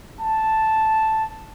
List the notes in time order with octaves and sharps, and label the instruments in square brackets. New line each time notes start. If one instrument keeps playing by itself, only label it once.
[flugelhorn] A5